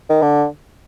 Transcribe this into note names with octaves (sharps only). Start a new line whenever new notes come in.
D#3
D3